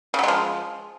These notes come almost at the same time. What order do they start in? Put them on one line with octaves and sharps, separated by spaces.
C#3 F#3 G#3 F3